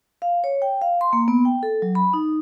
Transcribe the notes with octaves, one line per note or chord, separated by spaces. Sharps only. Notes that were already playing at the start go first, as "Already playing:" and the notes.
F5
C#5
G5
F5
C6
A#3
B3
G5
A4
F#3
B5
D#4